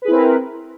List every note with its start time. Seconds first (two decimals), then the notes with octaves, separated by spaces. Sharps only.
0.02 B4
0.05 G#4
0.08 E4
0.11 C4
0.14 A#4